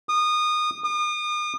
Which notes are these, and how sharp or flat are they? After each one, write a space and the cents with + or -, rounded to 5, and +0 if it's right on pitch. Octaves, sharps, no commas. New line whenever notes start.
D#6 -25
D#6 -40